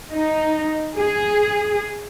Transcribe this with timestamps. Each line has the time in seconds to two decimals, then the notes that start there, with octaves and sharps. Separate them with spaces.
0.14 D#4
0.97 G#4